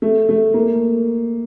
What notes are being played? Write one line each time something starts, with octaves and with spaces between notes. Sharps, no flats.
A3
A3
A#3